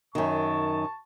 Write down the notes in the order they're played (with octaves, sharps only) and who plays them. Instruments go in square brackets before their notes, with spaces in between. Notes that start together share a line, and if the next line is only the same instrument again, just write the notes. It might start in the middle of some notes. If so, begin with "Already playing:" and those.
[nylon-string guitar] F#2 D#3 [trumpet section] A5 C#6